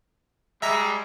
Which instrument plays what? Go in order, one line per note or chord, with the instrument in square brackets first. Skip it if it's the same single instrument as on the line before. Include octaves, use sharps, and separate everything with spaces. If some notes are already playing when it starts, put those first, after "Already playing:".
[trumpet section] G3 G#3 [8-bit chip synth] E5 A#5 B6